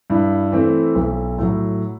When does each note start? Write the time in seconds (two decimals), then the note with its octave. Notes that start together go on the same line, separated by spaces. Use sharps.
0.10 G2 E4
0.52 E3 A3 C4
0.95 B1
1.38 A2 F#3